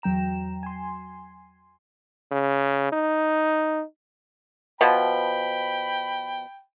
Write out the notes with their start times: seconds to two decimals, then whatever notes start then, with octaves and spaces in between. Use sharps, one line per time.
0.02 E2 F#3 G5 A#5 E7
0.63 G#5 C6
2.31 C#3
2.92 D#4
4.81 B2 F3 G5 B5